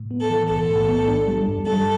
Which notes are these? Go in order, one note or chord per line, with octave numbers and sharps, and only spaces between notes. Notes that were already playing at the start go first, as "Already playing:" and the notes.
Already playing: A2
B3
A4
E3
B1 A4
A2
B3
D4
G3
G2
G3 A4